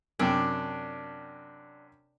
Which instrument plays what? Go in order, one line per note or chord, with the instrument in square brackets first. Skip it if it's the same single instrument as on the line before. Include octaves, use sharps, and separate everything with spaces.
[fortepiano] F#2 C3 G5 [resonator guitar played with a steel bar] D4